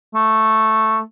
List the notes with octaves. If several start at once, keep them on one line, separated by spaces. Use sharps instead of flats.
A3